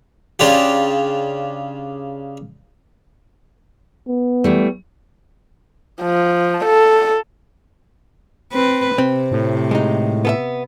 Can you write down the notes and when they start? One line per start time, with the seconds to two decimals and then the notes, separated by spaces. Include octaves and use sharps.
0.39 C#3 D4 F4 G4
4.08 B3
4.44 E3 G3 A3
6.02 F3
6.65 A4
8.53 C4 B4
8.98 C3 C4
9.32 A2
9.71 G#3 D#4
10.25 B3 A4 E5